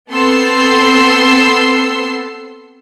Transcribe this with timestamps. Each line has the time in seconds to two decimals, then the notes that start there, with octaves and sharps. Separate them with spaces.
0.10 B3 C4 A4 C6 E6 C7